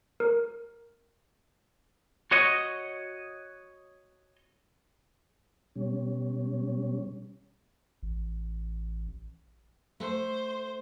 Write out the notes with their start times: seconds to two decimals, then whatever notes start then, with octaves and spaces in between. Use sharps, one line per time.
0.20 A#4
2.31 F#4 C#5 D#5
5.75 B2 G3 C#4
8.03 A1
10.00 A3 C5